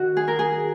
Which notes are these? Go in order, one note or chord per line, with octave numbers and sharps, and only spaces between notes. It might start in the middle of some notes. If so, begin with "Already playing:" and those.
Already playing: D#3 F#4
G#4
A#4
G#4